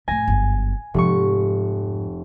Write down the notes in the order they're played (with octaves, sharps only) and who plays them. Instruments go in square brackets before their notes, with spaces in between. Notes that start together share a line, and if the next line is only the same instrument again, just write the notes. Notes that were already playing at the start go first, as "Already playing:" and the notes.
[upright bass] F2 A2 [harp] G#5 A#6
[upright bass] G1 F#2
[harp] F1 C#6 [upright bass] F2 G#2